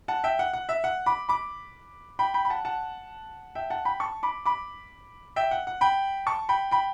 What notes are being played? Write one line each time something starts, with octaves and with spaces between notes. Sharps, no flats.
F#5 A5
E5 G5
F#5
F#5
E5
F#5
B5 D6
B5 D6
G5 B5
G5 B5
B5
F#5 A5
F#5 A5
E5 G5
F#5 A5
G5 B5
A5 C#6
B5 D6
B5 D6
E5 G5
F#5
F#5
G5 B5
A5 C#6
G5 B5
G5 B5